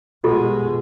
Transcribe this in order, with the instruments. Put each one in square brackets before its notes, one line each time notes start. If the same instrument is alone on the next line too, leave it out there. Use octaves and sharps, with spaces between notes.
[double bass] B2 G#3 [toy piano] F4 G4 A4